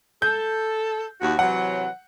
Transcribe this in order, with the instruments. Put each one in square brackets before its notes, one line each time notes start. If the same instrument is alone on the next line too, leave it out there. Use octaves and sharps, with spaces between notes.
[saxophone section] A4 [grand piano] G6
[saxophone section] D#2 F#4
[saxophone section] C3 E3 F#3 [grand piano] F#5